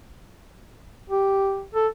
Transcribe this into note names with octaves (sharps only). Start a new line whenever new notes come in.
G4
A4